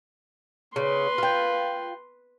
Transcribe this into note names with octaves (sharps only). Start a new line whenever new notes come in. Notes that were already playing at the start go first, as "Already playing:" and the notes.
C#3 B4 C6
F4 G5